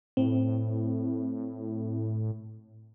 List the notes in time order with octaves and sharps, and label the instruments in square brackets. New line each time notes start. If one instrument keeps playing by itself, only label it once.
[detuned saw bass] A2 [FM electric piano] C4